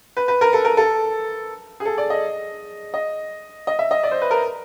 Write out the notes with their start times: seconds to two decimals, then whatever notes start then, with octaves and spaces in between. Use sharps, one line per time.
0.17 B4
0.28 B4
0.41 A#4
0.53 A4
0.65 A#4
0.77 A4
1.80 G#4
1.85 A4
1.98 D5
2.10 D#5
2.94 D#5
3.67 D#5
3.79 E5
3.91 D#5
4.03 D5
4.11 C5
4.22 B4
4.31 A#4